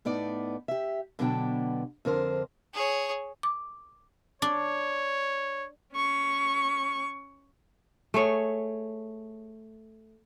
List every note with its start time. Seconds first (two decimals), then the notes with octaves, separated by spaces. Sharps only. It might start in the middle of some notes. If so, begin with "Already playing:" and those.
0.05 A2 B3 D#4 D5
0.68 G4 E5
1.19 B2 D3 F#3 B3 D4 G5
2.05 F2 D3 A#4 C5
2.74 G#4 C#5
3.43 D6
4.42 D4 C#5
5.94 C#4 C#6
8.14 A3 G#4 C#5